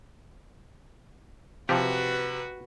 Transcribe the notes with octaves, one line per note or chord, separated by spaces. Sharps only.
C3 F3 F#4 G4 B4